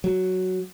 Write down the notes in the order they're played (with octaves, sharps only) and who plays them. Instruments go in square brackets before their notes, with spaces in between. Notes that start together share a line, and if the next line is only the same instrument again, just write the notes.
[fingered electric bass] F#3